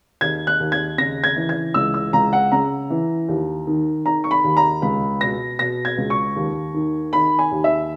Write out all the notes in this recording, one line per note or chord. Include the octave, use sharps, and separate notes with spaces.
D#2 G#6
F#6
D#2
G#6
C#3 A#6
G#6
E3
G#6
C#2 E6
E6
C#2 A#5
F#5
C#3 A#5
E3
D#2
D#3
D#3 A#5
C#6
B5
D#2
A#5
C#2 B5
B2 A#6
B2 A#6
G#6
C#2
C#6
D#2
D#3
D#3 B5
G#5
D#2
E5